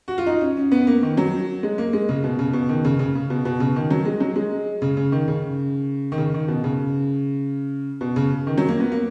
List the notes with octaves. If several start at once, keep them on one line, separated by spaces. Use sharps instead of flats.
F#4
F4
D#4
C#4
C#4
B3
A#3
D#3
F#3
G#3
A#3
G#3
C#3
B2
C#3
B2
D#3
C#3
C#3
C#3
B2
B2
C#3
D#3
F#3
G#3
F#3
G#3
C#3
C#3
D#3
C#3
D#3
C#3
D#3
B2
C#3
B2
C#3
D#3
F#3
A#3
B3
A#3